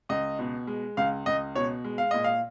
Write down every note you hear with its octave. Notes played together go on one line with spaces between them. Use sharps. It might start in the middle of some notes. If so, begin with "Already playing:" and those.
C#2 D#5
B2
G#3
C#2 F5
C#2 D#5
B2 C#5
G#3
F5
A#2 D#5
F5